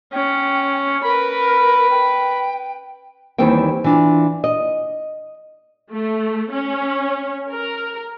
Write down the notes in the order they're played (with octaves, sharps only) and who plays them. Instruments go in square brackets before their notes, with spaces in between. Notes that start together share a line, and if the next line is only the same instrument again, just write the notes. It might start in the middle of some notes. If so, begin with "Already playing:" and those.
[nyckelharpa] C#4 [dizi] G5
[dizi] A#4 [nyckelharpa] B4 B5
[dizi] G5
[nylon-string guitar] D#2 D#3 E3 G3 C4 G5
E3 D4 F4
D#5
[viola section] A3
C#4
A#4